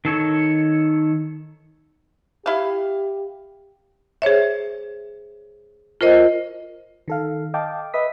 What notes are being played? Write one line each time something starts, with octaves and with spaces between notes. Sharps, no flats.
D#3 A4 C#5
E4 G4 F5
G#4 C5 C#5 E5
F4 A#4 C5 D#5
D#3 A4 F5
D#5 F5 G5 A5 D6
B4 D#5 E5 D#6 B6